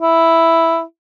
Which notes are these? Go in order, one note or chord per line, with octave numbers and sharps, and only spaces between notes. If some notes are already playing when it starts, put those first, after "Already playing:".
E4